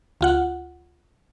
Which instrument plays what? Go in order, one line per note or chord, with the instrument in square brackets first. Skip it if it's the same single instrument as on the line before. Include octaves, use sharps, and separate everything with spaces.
[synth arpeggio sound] D2 F4 F#5